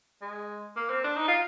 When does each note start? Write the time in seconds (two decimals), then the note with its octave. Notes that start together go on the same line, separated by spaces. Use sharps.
0.22 G#3
0.76 A#3
0.90 C4
1.04 D4
1.17 D#4
1.28 F4